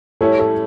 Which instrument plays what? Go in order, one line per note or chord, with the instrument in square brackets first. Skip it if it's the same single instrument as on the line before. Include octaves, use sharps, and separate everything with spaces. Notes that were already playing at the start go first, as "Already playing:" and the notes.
[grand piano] A2 G3 C#4 E4 [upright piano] A4 C#5
[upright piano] A4 C#5